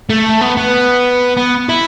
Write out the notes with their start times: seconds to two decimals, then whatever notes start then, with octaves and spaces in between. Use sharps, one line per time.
0.10 A3
0.41 B3
0.57 B3
1.37 B3
1.69 E4